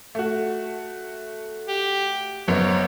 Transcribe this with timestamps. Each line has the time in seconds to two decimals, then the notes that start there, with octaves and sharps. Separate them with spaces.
0.15 A3 F#4
1.68 G4
2.48 F#1 F#2 B3 C#5